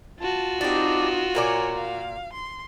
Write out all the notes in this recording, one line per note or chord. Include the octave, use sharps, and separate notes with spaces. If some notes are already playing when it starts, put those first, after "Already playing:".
F4 F#4 A5
C4 D4 D#4 G4
A#2 A#4 C#5 D5 G#5
F5
C6